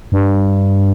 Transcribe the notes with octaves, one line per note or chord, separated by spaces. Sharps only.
G2